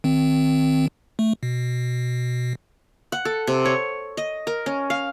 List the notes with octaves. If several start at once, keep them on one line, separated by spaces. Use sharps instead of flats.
D#3 C4
A3
B2
F#5
A4
C3
C#5
D#5
A#4
C#4
F5